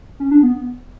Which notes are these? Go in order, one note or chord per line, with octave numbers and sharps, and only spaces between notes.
C#4
D4
B3